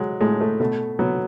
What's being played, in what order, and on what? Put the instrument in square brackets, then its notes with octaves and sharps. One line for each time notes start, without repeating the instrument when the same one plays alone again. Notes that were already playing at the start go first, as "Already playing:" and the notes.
Already playing: [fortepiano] F#3 G#3
A2 G#3
A3
B2 A3
F#3 B3